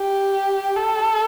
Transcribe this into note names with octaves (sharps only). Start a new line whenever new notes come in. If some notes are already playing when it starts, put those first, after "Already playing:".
Already playing: G4
A4